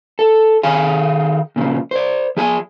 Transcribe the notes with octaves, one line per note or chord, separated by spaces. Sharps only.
A4
D#3 G#4 F5 G#5 B5
A#2 C#3 E3 F3
C5 D5
F3 G#4 G5 G#5